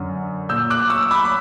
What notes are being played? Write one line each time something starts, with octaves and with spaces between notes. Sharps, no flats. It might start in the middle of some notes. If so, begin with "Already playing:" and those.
Already playing: F#2 D3
A#2 E6 G6
D6 F#6
C#6 E6
E6
B5 D6
B5